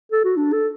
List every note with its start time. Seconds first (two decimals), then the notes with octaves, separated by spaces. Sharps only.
0.12 A4
0.24 F#4
0.37 D4
0.53 A4